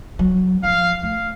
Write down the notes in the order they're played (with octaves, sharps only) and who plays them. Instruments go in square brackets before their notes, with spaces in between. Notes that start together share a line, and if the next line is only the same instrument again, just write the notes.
[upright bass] F#3
[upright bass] F3 [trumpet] F5
[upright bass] A3 [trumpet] F5